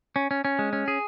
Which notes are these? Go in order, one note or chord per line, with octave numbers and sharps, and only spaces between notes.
C#4
C#4
C#4
G#3
C#4
G#4